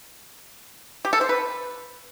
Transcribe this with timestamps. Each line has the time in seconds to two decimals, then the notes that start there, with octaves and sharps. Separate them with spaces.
1.05 G4
1.13 A4
1.21 C5
1.29 B4